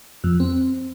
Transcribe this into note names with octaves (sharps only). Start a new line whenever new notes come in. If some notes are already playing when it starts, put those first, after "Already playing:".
F2
C4